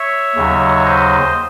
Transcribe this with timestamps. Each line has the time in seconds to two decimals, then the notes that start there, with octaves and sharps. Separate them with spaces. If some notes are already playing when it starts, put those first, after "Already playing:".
Already playing: C#5 E5
0.36 D#2 C#3 F#3
0.86 C5 D#5